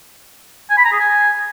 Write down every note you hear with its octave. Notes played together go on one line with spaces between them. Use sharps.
G#5
B5
A#5
G#4
G#5